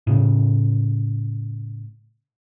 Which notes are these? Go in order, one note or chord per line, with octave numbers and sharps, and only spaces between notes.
A2 C#3